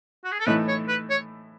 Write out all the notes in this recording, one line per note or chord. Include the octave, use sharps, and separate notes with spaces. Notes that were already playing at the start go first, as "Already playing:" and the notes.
F#4
G#4
A4
A2 E3 A3 D#4 B4
C#5
B4
C#5